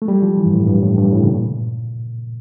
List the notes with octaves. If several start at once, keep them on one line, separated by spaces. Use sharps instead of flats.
A3
G3
F3
E3
G2
A2
G2
A2
G2
A2
C#3
A#2